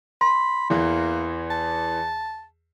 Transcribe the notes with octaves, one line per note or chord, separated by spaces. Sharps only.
B5 C6
E2 E3 A#3
A5